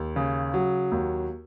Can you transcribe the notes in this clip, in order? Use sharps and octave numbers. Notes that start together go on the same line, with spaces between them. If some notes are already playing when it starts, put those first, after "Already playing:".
Already playing: D#2
C#3
F#3
D#2